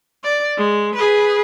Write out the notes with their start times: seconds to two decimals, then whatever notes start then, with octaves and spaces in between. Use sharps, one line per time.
0.24 D5
0.57 G#3
0.95 G#4 B4